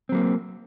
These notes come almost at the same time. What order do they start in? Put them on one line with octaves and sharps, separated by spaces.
C4 F#3 A#3